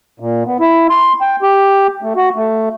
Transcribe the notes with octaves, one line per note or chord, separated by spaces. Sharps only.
A#2
B3
E4
C6
G5
G4
A3
F#4
A3